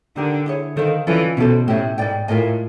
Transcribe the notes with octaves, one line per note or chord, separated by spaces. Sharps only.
D3 D#4 G4 A#4
E4 G#4 C#5
D#3 A4 C5 F5
E3 C#4 F4 A4 D5
B2 C#4 E4 A4 C5
A2 C#4 E4 G4
G#2 B4 D5 G5
A2 F4 A#4 D#5 G#5